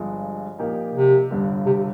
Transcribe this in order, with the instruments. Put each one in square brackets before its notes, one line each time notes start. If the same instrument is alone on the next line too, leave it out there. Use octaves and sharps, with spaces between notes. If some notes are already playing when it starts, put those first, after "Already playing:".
Already playing: [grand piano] G1 G2 F3 G#3
A#2 F3 A#3 D#4 G4
[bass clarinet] C3
[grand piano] G1 G2 D3
[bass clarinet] C3